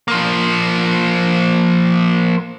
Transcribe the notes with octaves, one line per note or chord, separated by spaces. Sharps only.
F3 A#3